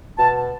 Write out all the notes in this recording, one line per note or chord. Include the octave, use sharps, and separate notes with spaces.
B2 A5